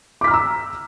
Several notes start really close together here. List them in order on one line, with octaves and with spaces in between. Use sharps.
D6 B6 F6 A#5 E6